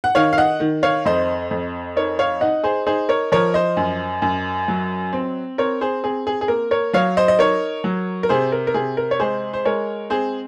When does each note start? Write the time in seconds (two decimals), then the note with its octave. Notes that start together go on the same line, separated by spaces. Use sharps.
0.04 F#5
0.15 D#3 C#5 F5
0.33 F5
0.38 D#5 F#5
0.60 D#3
0.83 C#5 F5
1.05 F2 C5 D#5
1.51 F2
1.96 D#4 A#4 C#5
2.19 C#5 F5
2.41 D#4 D#5 F#5
2.64 G#4 C5
2.86 D#4 G#4 C5
3.09 A#4 C#5
3.32 F3 A#4 C#5
3.54 C5 D#5
3.77 F#2
4.22 F#2
4.68 F#3
5.13 C4
5.58 C4 A#4 C#5
5.81 G#4 C5
6.04 C4 G#4
6.27 G#4
6.41 G#4
6.48 A#3 A#4
6.71 A#4 C#5
6.93 F#3 C#5 F5
7.17 C5 D#5
7.28 D#5
7.39 D#4 A#4 C#5
7.84 F#3
8.23 A#4
8.29 C3 G#4 C5
8.52 A#4
8.67 A#4
8.74 C3 G#4
8.97 A#4
9.11 C#5
9.20 G#3 G#4 C5
9.54 C5
9.65 G#3 A#4 C#5
10.10 C4 G#4 C5